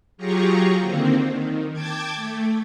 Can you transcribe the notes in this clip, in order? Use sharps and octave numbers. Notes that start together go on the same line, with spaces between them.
F#3 F4 G4 G#4 A#5 C#6
D3 D#3 A#3 C4
D#3
G5 A5 D6 G#6
A3